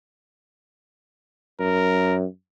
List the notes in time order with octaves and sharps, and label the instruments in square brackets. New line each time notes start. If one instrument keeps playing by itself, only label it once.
[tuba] F#2 [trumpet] A#4